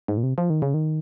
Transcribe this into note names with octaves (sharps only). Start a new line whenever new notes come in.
G#2
A#2
C3
F3
D#3
C#3
D#3